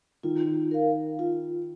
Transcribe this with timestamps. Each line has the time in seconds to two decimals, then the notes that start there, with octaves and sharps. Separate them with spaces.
0.23 D#3 F4
0.71 A#4 F5
1.19 F4